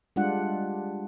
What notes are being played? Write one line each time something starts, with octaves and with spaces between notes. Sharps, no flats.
G3 G#3 D4 F4 F#5